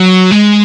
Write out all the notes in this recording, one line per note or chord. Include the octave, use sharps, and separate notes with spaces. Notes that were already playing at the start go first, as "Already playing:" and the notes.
Already playing: F#3
G#3